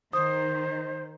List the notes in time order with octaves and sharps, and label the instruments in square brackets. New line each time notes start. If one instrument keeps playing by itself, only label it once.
[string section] D#3 [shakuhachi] C5 [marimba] D#6